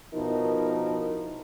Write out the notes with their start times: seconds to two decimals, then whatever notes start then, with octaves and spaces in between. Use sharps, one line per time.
0.14 B2 F3 D#4 E4 A#4